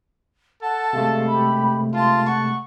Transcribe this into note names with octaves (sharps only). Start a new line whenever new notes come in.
A4 F#5 A5
C3 G#3 A3 F5
G4 B5
F4 A5 C6
F#5 C#6